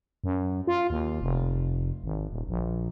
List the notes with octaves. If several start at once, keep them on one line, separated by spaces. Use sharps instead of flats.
F#2
F4
D#2
F1
G#1
D#1
A#1